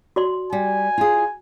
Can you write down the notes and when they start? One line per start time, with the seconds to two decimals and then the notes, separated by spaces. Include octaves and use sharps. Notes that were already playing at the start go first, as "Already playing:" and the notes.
0.16 F#4 D5 C6
0.53 G3 G#5
0.98 F4 G#4